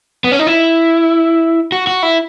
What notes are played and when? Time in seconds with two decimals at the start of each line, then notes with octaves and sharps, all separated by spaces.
0.24 B3
0.32 C#4
0.39 D#4
0.47 E4
1.72 F#4
1.87 F#4
2.03 E4